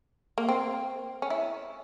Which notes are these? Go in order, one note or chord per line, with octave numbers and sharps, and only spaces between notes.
A#3
C4
C#4
E4